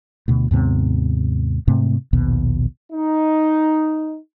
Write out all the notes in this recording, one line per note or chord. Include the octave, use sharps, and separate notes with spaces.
D2 B2
D#2 G#2 C3 B3
G#2 C3 A3 C4
A#1 D#2 B2
D#4